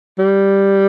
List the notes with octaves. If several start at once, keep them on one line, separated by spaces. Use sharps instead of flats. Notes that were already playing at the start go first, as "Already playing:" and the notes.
G3